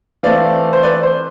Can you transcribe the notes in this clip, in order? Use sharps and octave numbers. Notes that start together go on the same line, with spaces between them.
E3 A3 C4 D5 F5
C5
B4 D5
C5